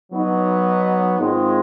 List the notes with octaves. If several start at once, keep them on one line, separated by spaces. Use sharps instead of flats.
F#3 B3 D#4
G#2 D#3 G#3 C4 F4